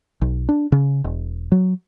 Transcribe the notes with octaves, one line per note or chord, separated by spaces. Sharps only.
B1
D4
C#3
E1
F#3